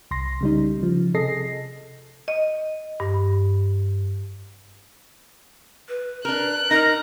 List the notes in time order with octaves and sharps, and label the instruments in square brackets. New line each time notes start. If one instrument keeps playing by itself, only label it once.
[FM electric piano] C2 C6 A#6
C#3 G3 D#4
C#3 F3
C3 G#4 A4 D#5 A#6 C7
[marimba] D#5
G2
[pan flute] B4
[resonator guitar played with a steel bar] D4 A#4 [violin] F#6
[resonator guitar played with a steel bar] D#4 [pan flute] A#4 [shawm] A#5